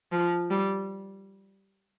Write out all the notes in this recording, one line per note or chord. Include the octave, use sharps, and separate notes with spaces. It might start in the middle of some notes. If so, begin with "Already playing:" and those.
F3
G3